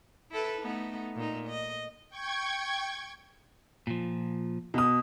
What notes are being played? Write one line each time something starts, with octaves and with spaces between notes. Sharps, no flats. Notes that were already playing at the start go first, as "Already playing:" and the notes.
E4 A4 B4
A3 B3 D#4
A#2 D#4
D#5
G5 C#6 G#6
A#2 F3
B2 D#6